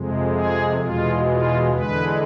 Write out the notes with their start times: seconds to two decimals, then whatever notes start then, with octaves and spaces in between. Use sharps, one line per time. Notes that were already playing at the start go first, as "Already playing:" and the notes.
Already playing: F2 C3 G#3
0.30 G#4
0.77 E2 B2 G#3 F4
1.25 F4
1.71 E2 D3 G#3 B4